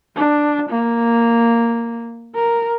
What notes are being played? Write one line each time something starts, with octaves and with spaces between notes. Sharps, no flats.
D4
A#3
A#4